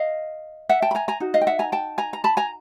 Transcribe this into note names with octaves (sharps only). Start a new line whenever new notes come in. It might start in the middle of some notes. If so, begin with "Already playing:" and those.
Already playing: D#5 F5
E5 F#5
G5 A5
B5
G#5 A#5
G#5 A#5
D#4 F#4
D#5 F5
G5
E5 F#5
G#5 A#5
G5 A5
G#5 A#5
A#5
A5 B5
G#5 A#5